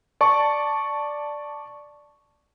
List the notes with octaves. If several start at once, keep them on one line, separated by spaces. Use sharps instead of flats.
D5 A5 C#6